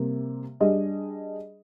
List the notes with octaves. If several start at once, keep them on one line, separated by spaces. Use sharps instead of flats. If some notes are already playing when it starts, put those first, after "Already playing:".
Already playing: C3 G3 A#3
G3 D4 G#4 D#5